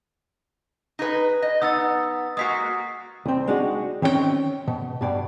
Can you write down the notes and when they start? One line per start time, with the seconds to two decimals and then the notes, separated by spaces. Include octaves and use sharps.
0.99 D#4 G#4 B4
1.42 D#5
1.62 B3 D#4 F#5 D#6 E6 A6
2.37 G#3 A#3 F#4 D#6 B6 C7
3.26 C2 C4
3.47 G#3 D4 D#4 F#4
4.02 D#3 C4 C#4 E4 G5
4.68 B2
5.01 G2 B2 D5